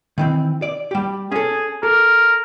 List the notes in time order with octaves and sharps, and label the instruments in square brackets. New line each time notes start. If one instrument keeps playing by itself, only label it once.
[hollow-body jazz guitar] D#3 E3 C4
D5
G3 G4
[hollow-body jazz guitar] C#4 A4 [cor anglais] G#4
[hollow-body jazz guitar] A4 [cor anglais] A#4